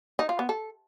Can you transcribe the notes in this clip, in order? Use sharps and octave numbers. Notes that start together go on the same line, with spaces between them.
D#4
F4
B3
A4